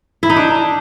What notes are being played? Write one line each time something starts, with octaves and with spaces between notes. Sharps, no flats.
E4
D#4
D4